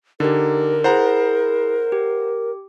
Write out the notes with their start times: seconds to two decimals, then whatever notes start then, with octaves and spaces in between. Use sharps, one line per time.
0.20 D3 D#4 G4 A#4
0.84 E4 G#4 C5 F#5 A#5
1.92 G4